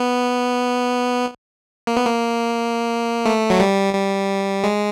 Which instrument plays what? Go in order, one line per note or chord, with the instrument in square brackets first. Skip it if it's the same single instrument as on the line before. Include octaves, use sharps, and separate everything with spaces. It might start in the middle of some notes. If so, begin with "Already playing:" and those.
Already playing: [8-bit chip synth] B3
A#3
B3
A#3
A3
F#3
G3
G3
G#3